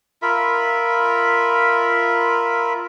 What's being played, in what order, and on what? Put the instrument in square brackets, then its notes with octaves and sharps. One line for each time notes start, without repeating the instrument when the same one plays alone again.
[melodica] F4 A#4 E5 B5